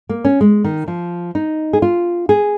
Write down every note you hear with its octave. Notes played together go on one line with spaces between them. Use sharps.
A#3
C#4
G#3
D#3
F3
D#4
G#4
F4
G#4